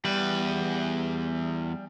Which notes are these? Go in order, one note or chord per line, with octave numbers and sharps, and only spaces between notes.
E2 G3 B4